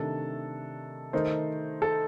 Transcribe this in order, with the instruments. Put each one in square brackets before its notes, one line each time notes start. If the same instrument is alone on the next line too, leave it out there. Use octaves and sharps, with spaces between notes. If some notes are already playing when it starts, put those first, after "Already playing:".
Already playing: [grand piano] C3 D#3 A3 D4 [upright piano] A4
[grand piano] D#3 A3 D#4 A#4 [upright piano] C5
[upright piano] A4